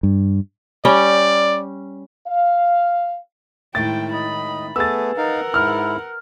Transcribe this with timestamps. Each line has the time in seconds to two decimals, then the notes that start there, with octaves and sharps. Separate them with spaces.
0.03 G2
0.85 G3 C#4 D5 G5
2.28 F5
3.75 A2 D#3 G#3 E4 G5 A6
4.13 D#5 B5
4.76 A3 B3 G#4 B4 E6 A6
5.17 D#4 A#4 F5 F#5
5.54 G#2 E4 F6